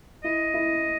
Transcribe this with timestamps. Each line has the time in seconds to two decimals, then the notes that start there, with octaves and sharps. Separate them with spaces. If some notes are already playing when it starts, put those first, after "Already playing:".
0.24 E4 D#5
0.54 E4